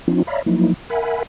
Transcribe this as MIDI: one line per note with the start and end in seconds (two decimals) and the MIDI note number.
0.08 0.23 53
0.08 0.23 60
0.08 0.23 62
0.08 0.23 63
0.08 0.23 65
0.27 0.42 73
0.27 0.42 74
0.27 0.42 76
0.27 0.42 77
0.27 0.42 82
0.27 0.42 83
0.46 0.74 53
0.46 0.74 54
0.46 0.74 58
0.46 0.74 63
0.46 0.74 64
0.90 1.23 70
0.90 1.23 76
0.90 1.23 78
0.90 1.23 80
0.90 1.23 83